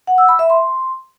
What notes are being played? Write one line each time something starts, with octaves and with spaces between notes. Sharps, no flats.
F#5
E6
B5
E5
C6